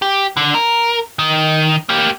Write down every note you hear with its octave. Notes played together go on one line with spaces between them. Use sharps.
G4
D3
A#4
D#3 D#4
A#3 G4